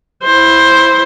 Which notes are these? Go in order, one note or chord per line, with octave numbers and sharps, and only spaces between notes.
E4 C5